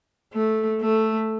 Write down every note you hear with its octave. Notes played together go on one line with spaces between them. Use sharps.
A3
A3